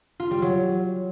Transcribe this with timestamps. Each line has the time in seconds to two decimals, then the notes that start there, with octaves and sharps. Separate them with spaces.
0.20 F4
0.31 G3
0.42 F#3